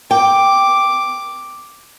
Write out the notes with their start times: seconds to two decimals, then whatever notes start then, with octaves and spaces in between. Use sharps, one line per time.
0.11 G5 D6